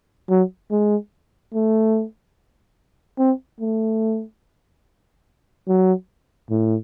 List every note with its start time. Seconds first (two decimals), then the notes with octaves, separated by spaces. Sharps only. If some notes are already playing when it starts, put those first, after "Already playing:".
0.30 F#3
0.71 G#3
1.54 A3
3.19 C4
3.61 A3
5.68 F#3
6.50 A2